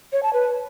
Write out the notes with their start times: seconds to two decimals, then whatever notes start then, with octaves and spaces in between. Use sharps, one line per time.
0.13 C#5
0.23 A5
0.33 B4